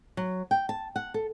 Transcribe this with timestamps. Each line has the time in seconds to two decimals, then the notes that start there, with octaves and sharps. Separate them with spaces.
0.17 F#3
0.51 G5
0.69 A5
0.96 F#5
1.14 A4